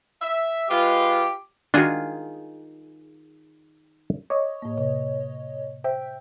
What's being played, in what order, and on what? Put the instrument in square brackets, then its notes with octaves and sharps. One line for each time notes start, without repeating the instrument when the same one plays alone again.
[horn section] E5
[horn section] G#3 F4 B4 [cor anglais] G4
[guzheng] D#3 F4 G#4 [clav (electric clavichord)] D4 F#4
[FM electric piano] C#5 D#5 [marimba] D6
[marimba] A2 A#3
C3
[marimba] C5 [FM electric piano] E5 G5